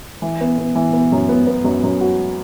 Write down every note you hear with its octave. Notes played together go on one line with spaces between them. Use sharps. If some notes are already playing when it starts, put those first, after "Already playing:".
E3
B3
B3
E3
B3
F#2
B3
B3
F#2
F#2
F#4